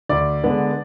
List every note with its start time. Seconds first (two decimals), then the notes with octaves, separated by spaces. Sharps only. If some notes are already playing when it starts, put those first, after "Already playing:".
0.09 D2 D5
0.43 D3 G#3 B3 D4